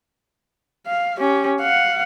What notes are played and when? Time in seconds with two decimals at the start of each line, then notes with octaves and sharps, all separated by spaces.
0.87 F5
1.19 C#4 G4
1.61 F5 F#5